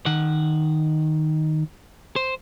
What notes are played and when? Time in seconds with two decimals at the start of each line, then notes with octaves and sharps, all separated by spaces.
0.06 D#3 F#5
2.16 C5